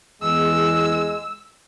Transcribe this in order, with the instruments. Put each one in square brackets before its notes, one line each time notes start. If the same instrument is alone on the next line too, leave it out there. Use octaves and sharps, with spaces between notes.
[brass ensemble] E2 [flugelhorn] G#3 [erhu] E6